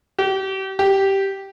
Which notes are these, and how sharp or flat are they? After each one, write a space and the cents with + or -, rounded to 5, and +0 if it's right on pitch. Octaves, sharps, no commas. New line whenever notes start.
G4 -35
G4 -10